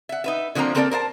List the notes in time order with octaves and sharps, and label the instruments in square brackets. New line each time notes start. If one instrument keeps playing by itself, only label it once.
[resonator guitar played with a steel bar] E5 F#5
D#4 B4 E5
D3 F3 A#3 C4 A#5
A#3 C4 A4 A#4 C#5 D5
A#4 C5 F5 A5